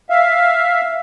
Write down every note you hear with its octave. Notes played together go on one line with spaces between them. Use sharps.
E5 F5